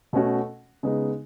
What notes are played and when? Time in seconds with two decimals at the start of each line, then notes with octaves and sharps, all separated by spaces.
0.13 B2 A3 C#4 F#4
0.83 C#3 G#3 B3 D#4